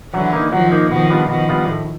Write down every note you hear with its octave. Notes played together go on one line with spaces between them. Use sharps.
D3 E3 F#3
A#3 D#4
D#3 F3 F#3
A#3 D#4
B2 D#3 F3
G3 B3 D4 F4
B2 D#3 F3
G3 B3 D4 F4
A2